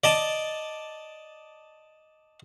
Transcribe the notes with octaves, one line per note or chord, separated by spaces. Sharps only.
D5 D#5 A5